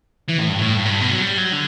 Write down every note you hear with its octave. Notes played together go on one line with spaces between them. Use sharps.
E3
A2
G2
A2
G2
A2
G2
B2
F#3
G3
F#3
D3